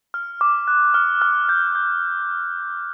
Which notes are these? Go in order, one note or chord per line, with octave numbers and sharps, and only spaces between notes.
F6
D6
F#6
F6
F6
G6
G6